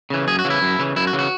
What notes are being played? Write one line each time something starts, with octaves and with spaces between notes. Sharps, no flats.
C#3 E3
F#2 G#4
F#4
C#3 E3
E4
F#2
C#3 E3
F#2 E4
F#4
C#3 E3
F#4